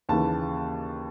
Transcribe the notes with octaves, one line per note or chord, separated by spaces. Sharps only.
D#2 C#3 E3 A5